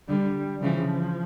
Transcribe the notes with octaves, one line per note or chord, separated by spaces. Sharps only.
D3 G3
C#3 E3 F3